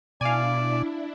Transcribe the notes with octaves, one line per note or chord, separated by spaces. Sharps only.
B2 D4 E4 D5 F5 G#5